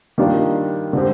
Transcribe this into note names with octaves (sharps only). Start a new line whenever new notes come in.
D#3 G3 A#3 D4 F4
D3 G#3 C4 G4